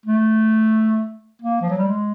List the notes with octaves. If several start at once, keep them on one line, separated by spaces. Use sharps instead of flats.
A3
A#3
F3
F#3
G3
G#3